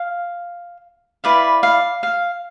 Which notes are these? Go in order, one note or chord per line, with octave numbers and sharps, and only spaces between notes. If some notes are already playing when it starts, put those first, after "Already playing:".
Already playing: F5
E4 B4 D5 F5
F5
F5